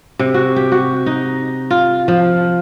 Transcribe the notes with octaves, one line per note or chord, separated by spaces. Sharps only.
C3
F#4
G4
F#4
D#4
F4
F3